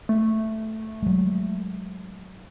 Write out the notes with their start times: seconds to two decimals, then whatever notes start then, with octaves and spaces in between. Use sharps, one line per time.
0.09 A3
1.03 F#3 G#3